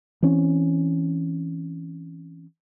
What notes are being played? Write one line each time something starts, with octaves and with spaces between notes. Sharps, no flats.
E3 C4 C#4